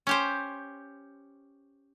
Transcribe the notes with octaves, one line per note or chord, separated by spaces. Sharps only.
C#4 G4 C5